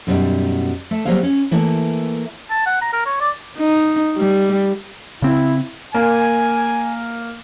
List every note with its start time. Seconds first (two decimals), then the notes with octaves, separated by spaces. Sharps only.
0.07 F#2 B2 G3 D#4
0.91 A3
1.05 F#3 G3 A#3 C4 G#4 F5
1.23 C#4
1.51 E3 A3 A#3 E4
2.50 A5
2.66 F#5
2.82 A#5
2.93 A#4
3.06 C#5
3.21 D5
3.57 D#4
4.17 G3
5.22 C#3 C4 E4
5.95 A#3 G#5